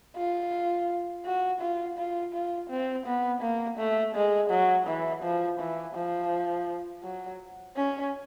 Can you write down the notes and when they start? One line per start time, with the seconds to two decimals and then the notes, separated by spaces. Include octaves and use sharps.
0.17 F4
1.25 F#4
1.61 F4
1.98 F4
2.33 F4
2.70 C4
3.06 B3
3.42 A#3
3.78 A3
4.15 G#3
4.50 F#3
4.87 E3
5.23 F3
5.60 E3
5.96 F3
7.04 F#3
7.77 C#4